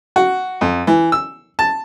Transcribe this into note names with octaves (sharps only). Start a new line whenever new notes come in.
F#4
F2
E3
E6
A5